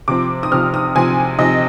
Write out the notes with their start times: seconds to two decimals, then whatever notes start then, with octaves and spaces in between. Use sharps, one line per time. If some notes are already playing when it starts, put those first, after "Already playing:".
0.08 C3 F3 C4 D6
0.43 D#6
0.51 C3 F3 C4 F6
0.74 D#6
0.95 C3 F3 C4 G#5
1.39 C3 F3 C4 D#5